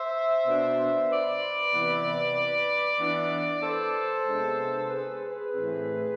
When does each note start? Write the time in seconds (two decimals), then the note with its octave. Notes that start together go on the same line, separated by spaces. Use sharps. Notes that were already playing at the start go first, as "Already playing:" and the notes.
Already playing: C5 E5
0.46 B2 B3 D4
1.09 B4 D5
1.73 C3 E3 B3
2.99 E3 B3 D4
3.62 A4 C5
4.26 C3 G#3 B3 D4
4.89 G#4 B4
5.21 G#4 B4
5.52 A2 E3 A3 C4